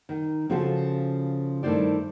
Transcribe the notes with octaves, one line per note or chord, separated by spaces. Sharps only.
D#3
C#3 F3 C#4 F4 F#4 A4
G2 D#3 A3 E4 C5 D5